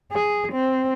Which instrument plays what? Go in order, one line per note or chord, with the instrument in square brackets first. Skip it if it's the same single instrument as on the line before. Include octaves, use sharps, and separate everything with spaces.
[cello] G#4
C4